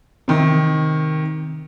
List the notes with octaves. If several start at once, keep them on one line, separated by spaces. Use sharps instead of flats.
C3 D#3